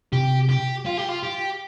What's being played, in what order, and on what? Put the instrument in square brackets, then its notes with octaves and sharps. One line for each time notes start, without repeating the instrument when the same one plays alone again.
[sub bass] C3 [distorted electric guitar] G4
[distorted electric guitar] G4
F4
G4
F4
G4